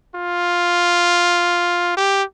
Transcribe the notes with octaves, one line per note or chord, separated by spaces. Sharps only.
F4
G4